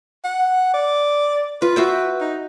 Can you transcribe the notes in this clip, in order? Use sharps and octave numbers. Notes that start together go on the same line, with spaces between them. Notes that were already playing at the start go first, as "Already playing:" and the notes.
F#5
D5
F4 B4
F#4 E5 G5
D#4